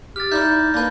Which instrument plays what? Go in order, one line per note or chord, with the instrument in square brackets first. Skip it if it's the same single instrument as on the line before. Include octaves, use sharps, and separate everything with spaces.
[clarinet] G4 [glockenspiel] F6 A6
[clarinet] D#4 [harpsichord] E4 D5 E5 [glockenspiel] G6
[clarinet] A#3 [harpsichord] D4 B4